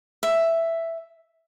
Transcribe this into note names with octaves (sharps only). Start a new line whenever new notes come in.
E5